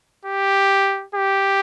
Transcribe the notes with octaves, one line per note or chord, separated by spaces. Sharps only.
G4
G4